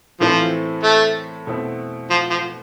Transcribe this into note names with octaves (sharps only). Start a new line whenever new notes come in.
A2 E3 F3 A3 C4 E4
A3
B2 A3 C4 E4
F3
F3